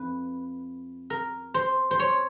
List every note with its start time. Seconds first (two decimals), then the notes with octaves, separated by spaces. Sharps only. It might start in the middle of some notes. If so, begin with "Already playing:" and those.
Already playing: F2 B4
1.10 A#4
1.54 C5
1.91 C5
1.99 C#5